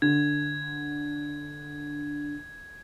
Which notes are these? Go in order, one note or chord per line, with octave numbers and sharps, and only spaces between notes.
D3 G#6